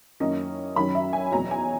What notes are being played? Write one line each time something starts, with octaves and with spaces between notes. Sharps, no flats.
F#2 D#3 A#3 C#4 E4 D#5
F#2 D#3 F#3 C#4 B5
E5
G#5
E2 B2 F#3 A#5
G#5